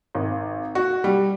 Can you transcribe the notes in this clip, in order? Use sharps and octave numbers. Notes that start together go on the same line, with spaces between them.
G#1
F#4
G3